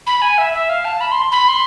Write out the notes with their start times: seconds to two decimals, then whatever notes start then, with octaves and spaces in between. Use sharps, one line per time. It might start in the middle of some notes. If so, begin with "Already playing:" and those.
0.07 B5
0.22 G#5
0.38 E5
0.53 E5
0.69 F5
0.85 A5
1.01 B5
1.11 C6
1.32 B5
1.48 C6